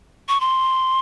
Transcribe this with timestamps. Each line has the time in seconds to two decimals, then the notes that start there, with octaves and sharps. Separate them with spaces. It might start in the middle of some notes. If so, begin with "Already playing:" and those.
0.29 C#6
0.40 C6